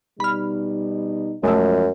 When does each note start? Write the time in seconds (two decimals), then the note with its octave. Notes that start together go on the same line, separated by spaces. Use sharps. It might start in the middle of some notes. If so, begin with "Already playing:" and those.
0.20 B2 G3 D#4 B5 F6
1.44 F#2 F3 G#3 A3 D#5